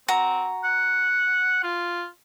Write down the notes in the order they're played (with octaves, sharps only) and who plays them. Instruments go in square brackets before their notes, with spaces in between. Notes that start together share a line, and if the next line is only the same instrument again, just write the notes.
[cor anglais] C4 [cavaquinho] F#4 A#5
[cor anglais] F#5
F4